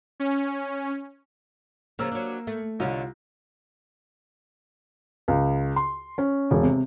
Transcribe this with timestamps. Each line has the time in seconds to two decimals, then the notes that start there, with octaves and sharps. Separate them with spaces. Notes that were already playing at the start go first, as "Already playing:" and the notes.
0.20 C#4
1.99 C#3 F3 A#3 E6
2.12 F#3 D4
2.47 A3
2.80 C2 D3 C#4 F4 D#5
5.28 C#2
5.76 C6
6.18 C#4
6.51 E1
6.63 C3